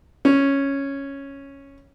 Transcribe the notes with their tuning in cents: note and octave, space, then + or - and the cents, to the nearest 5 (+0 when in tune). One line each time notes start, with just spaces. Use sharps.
C#4 -5